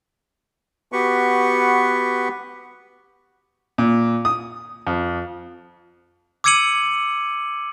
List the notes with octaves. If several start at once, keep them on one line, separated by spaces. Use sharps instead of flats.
B3 F#4 G4 B4 C#6
A#2
D#6
F2
D6 E6 G#6 C#7 D#7 F#7